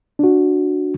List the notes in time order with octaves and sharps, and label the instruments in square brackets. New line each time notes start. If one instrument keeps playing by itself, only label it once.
[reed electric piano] D4 F#4